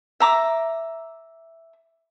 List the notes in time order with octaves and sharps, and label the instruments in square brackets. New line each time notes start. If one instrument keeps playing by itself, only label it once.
[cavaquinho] E5 A#5 D6